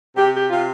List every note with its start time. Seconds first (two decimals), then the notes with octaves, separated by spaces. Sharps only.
0.17 C3 G4
0.34 G4
0.50 C3 F4